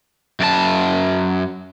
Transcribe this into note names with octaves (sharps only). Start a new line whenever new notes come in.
F#2 G4 A5